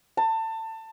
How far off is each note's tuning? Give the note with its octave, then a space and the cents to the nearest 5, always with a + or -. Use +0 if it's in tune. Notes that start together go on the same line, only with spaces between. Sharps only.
A5 +25